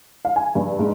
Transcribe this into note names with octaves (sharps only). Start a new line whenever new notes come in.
F5
G#5
G2
G#2